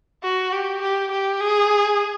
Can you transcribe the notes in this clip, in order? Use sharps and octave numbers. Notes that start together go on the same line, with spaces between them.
F#4
G4
G4
G4
G#4